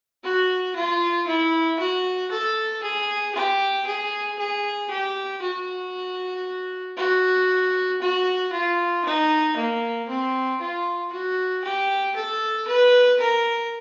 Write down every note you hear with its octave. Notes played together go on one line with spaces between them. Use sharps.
F#4
F4
E4
F#4
A4
G#4
G4
G#4
G#4
G4
F#4
F#4
F#4
F4
D#4
A#3
C4
F4
F#4
G4
A4
B4
A#4